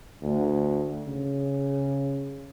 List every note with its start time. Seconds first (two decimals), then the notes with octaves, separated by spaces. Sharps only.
0.23 D2
1.07 C#3